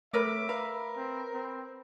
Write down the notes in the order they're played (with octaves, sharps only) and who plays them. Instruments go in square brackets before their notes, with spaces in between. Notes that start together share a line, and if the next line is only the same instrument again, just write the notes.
[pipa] C3 A#4 B4 [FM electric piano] A3 C#5 [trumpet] E5 [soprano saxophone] D6
[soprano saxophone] A#4 [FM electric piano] B4 B5 [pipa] F5
[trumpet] C4
C4